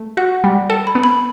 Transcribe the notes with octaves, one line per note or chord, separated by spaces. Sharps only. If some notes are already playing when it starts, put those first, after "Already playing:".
Already playing: A3
F#4 F#5
G3
A4 A5
B5
B3
B5